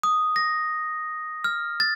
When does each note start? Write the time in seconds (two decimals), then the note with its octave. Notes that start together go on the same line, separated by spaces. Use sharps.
0.03 D#6
0.36 A#6
1.44 F6
1.80 A6